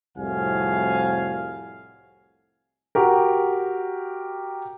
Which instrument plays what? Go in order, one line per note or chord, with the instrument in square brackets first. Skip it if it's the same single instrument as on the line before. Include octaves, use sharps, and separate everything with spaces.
[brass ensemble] C2 F2 A2 F#4 F5 G#5
[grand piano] F#4 G4 A#4